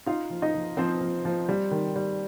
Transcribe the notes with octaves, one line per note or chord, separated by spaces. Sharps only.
D#4 F4 F5
F3
D#4 D#5
F3
F3 C4 C5
F3
F3
G3
D#3
G3